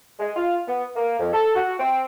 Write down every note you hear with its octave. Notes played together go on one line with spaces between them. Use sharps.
G#3
F4
B3
A#3
F2
A4
F#4
C4